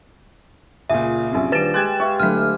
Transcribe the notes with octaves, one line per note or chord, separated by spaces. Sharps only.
C#2 A#2 G#4 E5
A#1 F#2 C3
D#1 D4 B4 A6 D7 E7
G#3 G4 F#6 G#6
E5 F5 C#6
D3 F#3 A3 F6